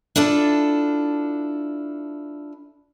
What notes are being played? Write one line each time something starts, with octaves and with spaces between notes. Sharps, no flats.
D4 E4 F4 A4